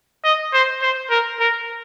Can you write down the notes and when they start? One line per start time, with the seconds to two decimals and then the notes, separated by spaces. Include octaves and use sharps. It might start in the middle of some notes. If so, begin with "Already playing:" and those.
0.24 D#5
0.53 C5
0.82 C5
1.10 A#4
1.40 A#4